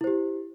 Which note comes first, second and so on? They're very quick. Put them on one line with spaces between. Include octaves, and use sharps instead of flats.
E4 C5 G4